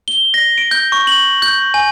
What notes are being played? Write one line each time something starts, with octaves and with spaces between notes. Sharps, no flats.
G7
A#6
D7
G6
C#6
F#7
G6
G#5